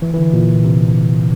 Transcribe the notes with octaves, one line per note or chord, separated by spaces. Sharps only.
E3
E3
D3
A#2
C3